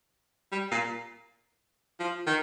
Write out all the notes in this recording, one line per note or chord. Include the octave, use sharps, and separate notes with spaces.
G3
A#2
F3
D#3